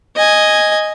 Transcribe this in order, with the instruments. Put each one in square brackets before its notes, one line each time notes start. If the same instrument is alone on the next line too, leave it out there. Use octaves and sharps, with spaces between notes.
[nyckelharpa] D#5 G#5